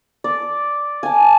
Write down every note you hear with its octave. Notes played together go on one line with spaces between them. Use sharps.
D5
G#5 A5